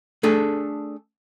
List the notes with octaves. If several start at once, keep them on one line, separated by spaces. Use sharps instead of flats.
A3 D4 G#4 A4